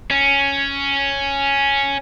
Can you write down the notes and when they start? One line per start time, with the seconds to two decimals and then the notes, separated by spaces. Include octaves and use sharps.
0.11 C#4